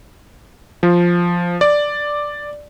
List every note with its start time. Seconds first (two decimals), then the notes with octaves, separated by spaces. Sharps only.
0.83 F3
1.61 D5